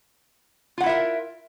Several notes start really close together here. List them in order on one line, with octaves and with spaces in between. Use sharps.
F4 F#5 E4 E5 A#4